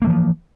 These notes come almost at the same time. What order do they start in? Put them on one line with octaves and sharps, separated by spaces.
A#3 A3 E3 F3